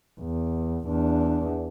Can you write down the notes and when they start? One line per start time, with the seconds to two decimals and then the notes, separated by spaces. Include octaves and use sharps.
0.20 E2
0.88 E2 D4